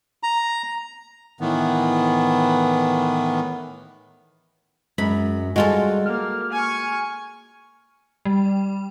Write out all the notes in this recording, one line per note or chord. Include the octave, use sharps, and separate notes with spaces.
A#5
A2 D#3 E3 B3
F#2 G#3 B5
G3 G#3 F4 F#4 A4
A#3 F6
G#5 C#6
G3